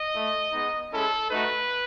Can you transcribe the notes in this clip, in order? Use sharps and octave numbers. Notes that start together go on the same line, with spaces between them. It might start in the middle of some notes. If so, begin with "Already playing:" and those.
Already playing: D#5
A3 E4
G#3 B3 D#4
G#3 C#4 E4 A4
A3 D#4 F#4 B4